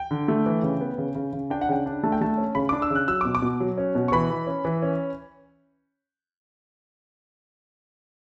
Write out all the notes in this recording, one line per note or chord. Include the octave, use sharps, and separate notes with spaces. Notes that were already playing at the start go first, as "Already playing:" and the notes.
Already playing: G5
D3
A3
E3
C#3
B3
C#3
C#3
C#3
D4 G5
F#5
C#3 G5
D4
A3 A5
G5
A3 A5
C#4
C#3 B5
D4 D6
E6
C#3
F#6
F#3 E6
B2 D6
D6
B2
F#3
C#4
B2
C#6
E3 B5
E3
C#4
E3
C#4